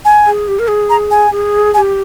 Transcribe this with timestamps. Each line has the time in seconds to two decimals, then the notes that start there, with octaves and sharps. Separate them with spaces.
0.05 G#5
0.27 G#4
0.48 G4
0.59 A#4
0.68 G#4
0.90 A#5
1.11 G#5
1.31 G#4
1.73 G#4 G#5
1.78 G4